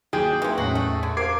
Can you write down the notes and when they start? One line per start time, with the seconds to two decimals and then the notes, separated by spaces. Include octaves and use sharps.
0.13 D#2 F#3 G4 G#4
0.42 C3 E3 A#3 D#4
0.58 E2 A2 C#4 F#4 F#7
0.75 A3
1.03 D3 G#6
1.17 A#4 C5 F5 D6 G#6 C7 D7